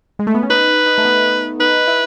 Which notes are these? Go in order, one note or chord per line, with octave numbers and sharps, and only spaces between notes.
G#3
A3
B3
C#4
D#4 B4
D#4
A3
B3
D#4 B4
E4